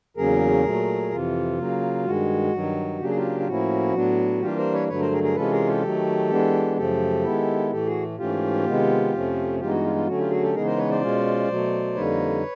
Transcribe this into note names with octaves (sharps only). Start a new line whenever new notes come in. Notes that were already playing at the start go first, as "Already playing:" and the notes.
E2 C#3 F#3 A#3 C#4 G#4 A#4
A#2 F#3 A3
F2 C3 E3 F4
C#3 F#3 A#3
G2 D#3 G#3 F#4
G2 D#3 F#3
C#3 F#3 A#3 D4 G4
G#4
F4 G4
F4
A2 F3 A#3 C#4 E4 F#4
A2 F#3 B3 D4
E3 G3 A#3 D4 F4 G4
A#4 C5
B4 C#5
G2 D3 F#3 A3 B4 C#5
A#4 C5
G#4 A#4
G#4 A#4
C3 E3 G#3 C#4 F4 A4 B4
G#4 A#4
G4 A4
D#3 F#3 A3
E3 G#3 B3 D4
F#2 C#3 F3 A3 G4 A4
D#3 G#3 B3 E4
A2 E3 A3 G4 A4
F#4 G#4
G#2 E3 A3 C#4 F4 G4
C3 D#3 G#3 B3
F2 C3 F3 A3 C#4
G2 E3 G#3 B3 D#4 F4 G4
F#4
F4
F4
D3 F#3 A3 C#4 F#4
F4 G4
F#4 G#4
G4 A4
C#3 E3 G#3 B3 D#4 G#4 A#4
A#4 C5
B4 C#5
C5 D5
B2 G#3 C#4 F4
B2 F#3 A3
F2 D3 G3 A#3 D#4 B4 C#5